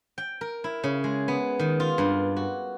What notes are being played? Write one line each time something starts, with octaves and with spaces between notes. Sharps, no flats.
G5
A#4
E4
C#3
G#3
B3
D#3
F4
G2
F#4